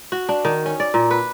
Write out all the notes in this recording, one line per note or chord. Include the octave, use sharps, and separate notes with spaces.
F#4
D4
D#3
C#4
D5
A#2
B4